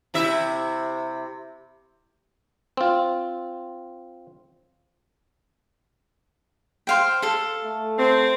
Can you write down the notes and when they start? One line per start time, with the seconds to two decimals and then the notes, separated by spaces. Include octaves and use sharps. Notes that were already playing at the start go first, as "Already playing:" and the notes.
0.14 C3 E4 E5
2.77 C4 F4
6.87 C5 F5 G5
7.22 A4 F5
7.64 A3
7.98 C4